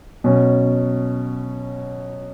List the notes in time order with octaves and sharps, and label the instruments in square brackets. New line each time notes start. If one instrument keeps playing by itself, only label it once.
[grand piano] B2 F#3 C#4